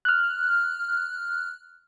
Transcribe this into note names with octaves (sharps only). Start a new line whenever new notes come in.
F6 F#6